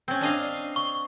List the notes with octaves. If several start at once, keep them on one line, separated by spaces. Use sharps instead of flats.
C4 C#4
D4 D#5 F5
C#6